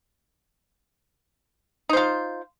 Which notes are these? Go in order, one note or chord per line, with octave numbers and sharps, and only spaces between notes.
D#4 F4 C5